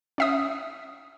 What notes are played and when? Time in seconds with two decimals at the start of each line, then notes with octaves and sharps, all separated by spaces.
0.18 C#4 E5 D#6